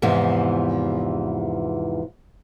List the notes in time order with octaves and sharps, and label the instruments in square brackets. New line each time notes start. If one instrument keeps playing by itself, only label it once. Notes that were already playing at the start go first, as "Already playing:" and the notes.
[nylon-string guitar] E2 G#2 C3 E3 F3